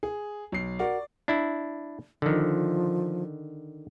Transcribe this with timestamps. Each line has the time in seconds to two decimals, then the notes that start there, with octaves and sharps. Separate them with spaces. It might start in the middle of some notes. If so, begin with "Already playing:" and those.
0.03 G#4
0.52 B1 C7
0.79 F#4 A#4 D5 F#5
1.28 D4 E4
2.22 D3 D#3 F3